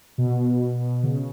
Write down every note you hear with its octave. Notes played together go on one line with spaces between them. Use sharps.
B2
C#3